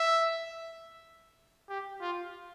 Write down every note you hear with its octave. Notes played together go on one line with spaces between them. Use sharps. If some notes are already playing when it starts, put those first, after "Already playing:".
Already playing: E5
G4
F4